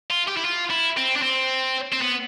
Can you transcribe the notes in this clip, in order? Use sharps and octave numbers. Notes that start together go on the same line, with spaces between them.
F4
G4
E4
F4
E4
C4
D4
C4
C4
B3